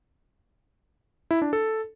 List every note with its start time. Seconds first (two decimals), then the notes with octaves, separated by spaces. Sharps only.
1.31 E4
1.42 D4
1.53 A4